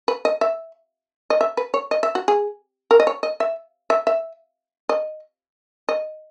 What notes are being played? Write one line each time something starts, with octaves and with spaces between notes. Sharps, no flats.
B4
D#5
E5
D#5
E5
B4
C#5
D#5
E5
F#4
G#4
A#4
D#5
C#5
D#5
E5
E5
E5
D#5
D#5